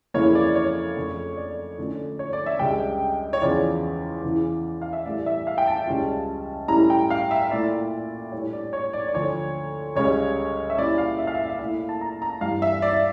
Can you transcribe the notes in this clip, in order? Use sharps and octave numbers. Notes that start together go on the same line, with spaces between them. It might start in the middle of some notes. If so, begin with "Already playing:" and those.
F2 C#3 E3 A#3 E4 C#5
D5
C#5
F2 C#3 F3 A3 D4
D5
D3 A3 C#4 F4
C#5
D5
E5
C#2 C#3 G3 D4 G5
C#5
E2 C#3 F3 D5
E2 C#3 E3
F5
E5
A2 E3 G3 D5
E5
F5
G5
A5
C#2 C#3 G3 C#4 F4
A2 G3 C#4 E4 A#5
G5
F5
E5
A#2 A3 E4 D5
A2 G3 D4 C#5
D5
C#5
D5
D5
D2 D3 F3 C#5
C#2 C#3 G3 C#5
E5
A#2 G3 C#4 E4 D5
F5
E5
F5
E5
E5
A#2 A3 E4 F5
A5
A#5
A#5
G2 E3 G3 F5
E5
D5